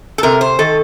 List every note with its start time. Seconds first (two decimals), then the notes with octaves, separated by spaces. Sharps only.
0.18 A4
0.23 C3 A#4
0.41 C5
0.59 D#3 A4